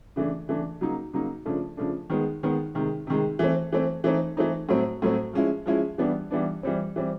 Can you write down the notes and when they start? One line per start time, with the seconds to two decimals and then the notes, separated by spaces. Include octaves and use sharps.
0.16 C#3 E3 A3 D4
0.48 C#3 E3 A3 D4
0.81 C#3 F#3 A#3 D#4
1.13 C#3 F#3 A#3 D#4
1.46 C#3 F3 A3 D4
1.77 C#3 F3 A3 D4
2.10 D#3 G#3 B3
2.43 D#3 G#3 B3
2.75 C3 D#3 G#3
3.07 C3 D#3 G#3
3.39 E3 A3 C4
3.72 E3 A3 C4
4.04 E3 A3 C4 D#4
4.37 E3 A3 C4 D#4
4.69 A2 F#3 A3 C4
5.02 A2 F#3 A3 C4
5.33 F3 G#3 C#4 E4
5.66 F3 G#3 C#4 E4
5.98 E3 G3 B3 D4
6.31 E3 G3 B3 D4
6.63 E3 G3 C4
6.96 E3 G3 C4